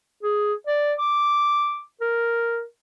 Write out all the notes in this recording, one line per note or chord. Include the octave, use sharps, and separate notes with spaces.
G#4
D5
D6
A#4